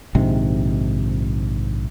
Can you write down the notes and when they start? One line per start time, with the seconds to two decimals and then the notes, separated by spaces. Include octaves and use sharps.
0.15 A#1 G#2 C3 D#3